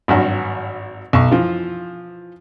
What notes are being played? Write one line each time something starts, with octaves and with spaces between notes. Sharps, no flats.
G#1 G2 F#3 F#4
B1 C#6
E3 F3 F4